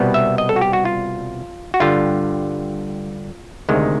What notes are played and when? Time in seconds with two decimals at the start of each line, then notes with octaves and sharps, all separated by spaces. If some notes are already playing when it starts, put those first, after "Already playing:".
Already playing: C2 B2 G3 B3
0.14 E5
0.38 D#5
0.49 A4
0.56 F#4
0.61 G4
0.73 F#4
0.85 F4
1.74 F#4
1.80 G2 D3 G3 F4
3.69 D2 C3 D#3 G#3